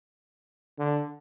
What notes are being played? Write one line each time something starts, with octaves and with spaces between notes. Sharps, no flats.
D3